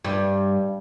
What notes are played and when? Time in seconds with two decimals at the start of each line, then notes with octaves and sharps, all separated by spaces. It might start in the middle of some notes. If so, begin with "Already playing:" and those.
0.05 G2